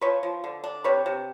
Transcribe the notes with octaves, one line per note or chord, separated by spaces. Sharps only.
F3 B4 C#5
F3
D3
D4
C3 B4 C#5
C3